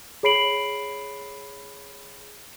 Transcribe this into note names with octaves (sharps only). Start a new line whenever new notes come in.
G#4 C#5 B5 C7 D7 F#7